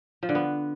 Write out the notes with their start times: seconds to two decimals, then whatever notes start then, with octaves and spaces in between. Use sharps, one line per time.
0.23 F3
0.29 D3
0.35 B3